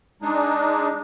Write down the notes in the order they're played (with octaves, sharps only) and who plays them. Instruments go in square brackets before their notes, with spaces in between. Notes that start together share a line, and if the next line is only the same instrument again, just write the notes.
[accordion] G#3 D4 D#4